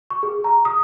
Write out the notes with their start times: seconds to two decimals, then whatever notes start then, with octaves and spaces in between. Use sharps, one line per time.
0.10 C#6
0.23 G#4
0.44 A#5
0.65 D#6